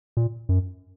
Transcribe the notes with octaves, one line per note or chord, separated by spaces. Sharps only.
A#2
F#2